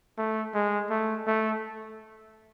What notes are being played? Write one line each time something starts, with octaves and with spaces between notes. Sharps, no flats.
A3
G#3
A3
A3